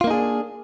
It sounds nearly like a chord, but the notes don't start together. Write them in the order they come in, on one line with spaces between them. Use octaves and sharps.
F4 A#3 D#4 G#4 D4